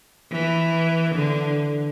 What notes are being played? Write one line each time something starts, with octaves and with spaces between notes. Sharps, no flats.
E3
D3